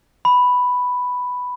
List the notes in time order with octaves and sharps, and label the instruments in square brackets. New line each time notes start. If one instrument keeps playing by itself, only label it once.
[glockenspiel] B5